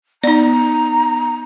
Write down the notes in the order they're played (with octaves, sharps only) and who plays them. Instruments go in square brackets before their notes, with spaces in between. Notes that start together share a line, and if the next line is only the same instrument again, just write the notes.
[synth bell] B3 [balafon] D#4 D5 [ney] A#5